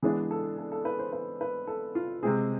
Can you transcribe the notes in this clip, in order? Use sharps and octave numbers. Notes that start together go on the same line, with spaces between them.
E3 G#3 B3 D4 G#4
A4
A4
A4
B4
C5
B4
B4
A4
F4
C3 G#3 C4 G#4